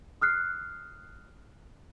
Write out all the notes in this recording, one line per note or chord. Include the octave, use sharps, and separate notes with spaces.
D#6 F6 F#6 C7